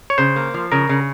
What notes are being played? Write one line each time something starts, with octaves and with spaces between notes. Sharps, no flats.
C#5
C#3 C5
A#3
F3
C#3 A#4
C#3